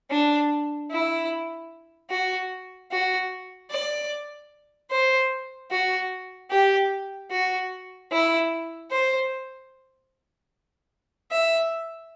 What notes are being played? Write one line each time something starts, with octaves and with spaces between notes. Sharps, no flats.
D4
E4
F#4
F#4
D5
C5
F#4
G4
F#4
E4
C5
E5